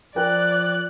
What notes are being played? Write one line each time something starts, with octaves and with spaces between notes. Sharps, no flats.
F3 A#4 D5 G5 F#6